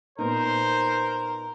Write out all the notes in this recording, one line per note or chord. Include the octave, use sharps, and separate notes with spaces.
A#2 B3 D#4 A#4 C5